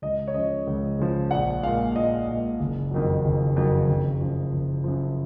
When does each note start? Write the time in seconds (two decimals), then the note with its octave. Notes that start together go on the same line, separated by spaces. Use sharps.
0.02 C#2 D#5
0.28 C#5
0.34 C#3 F3 D#5
0.67 C#2
0.99 C#3 F3
1.31 A#1 F#5
1.63 A#2 G#3 F5
1.95 A#1 D#5
2.28 A#2 G#3 D#5
2.60 F#1
2.91 F2 D#3 F#3
3.24 F#1
3.56 F2 D#3 F#3
3.88 F#1
4.21 F#2 F3
4.52 F#1
4.84 F#2 F3